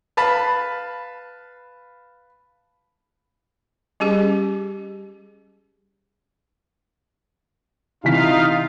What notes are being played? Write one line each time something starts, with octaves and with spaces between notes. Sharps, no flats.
B4 F5 A5 B5
G3 C#4 G4 G#4
C3 E3 D#4 F4 F5 B6